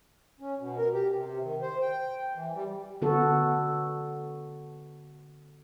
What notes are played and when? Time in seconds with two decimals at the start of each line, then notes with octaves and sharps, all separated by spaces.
0.40 C#4
0.60 B2
0.78 A#4
0.94 G4
1.16 C3
1.43 D#3
1.62 C5
1.82 G5
2.35 E3
2.54 G3
3.02 D3 B3 F#4 A4